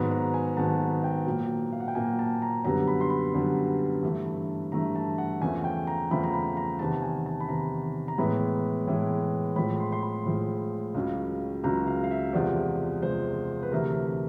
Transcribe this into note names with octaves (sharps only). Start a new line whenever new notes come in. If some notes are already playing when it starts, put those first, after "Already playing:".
Already playing: G#2 D#3 F#3 B3 B5
A#5
G#5
G#2 D#3 F#3 B3 A5
G5
A#2 F#3 A#3
F5
F#5
G5
A#2 F#3 A#3 G#5
A5
A#5
F#2 D3 G3 B3 A#5
B5
C6
B5
F#2 D3 G3 B3
G2 E3 A3
G2 E3 A3 A#5
A5
F#5
E2 C#3 F3 A3 G#5
G5
A#5
E2 C#3 F3 A3 B5
A#5
B5
A#5
E2 C3 D#3 A5
G#5
A5
B5
E2 C3 D#3 A#5
A#5
A2 E3 G#3 B3 B5
A2 E3 G#3 B3
A2 F3 G#3 B5
B5
C6
C6
B5
A2 F3 G#3
C#2 C#3 F#3
C#2 C#3 F#3 A#5
F5
F5
E5
E2 C3 F3 G#3 D5
E2 C3 F3 G#3 C5
B4
D2 C3 E3 A3 A#4